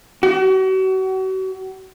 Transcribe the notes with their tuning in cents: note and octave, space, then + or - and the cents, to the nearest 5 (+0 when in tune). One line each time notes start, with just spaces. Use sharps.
F#4 +40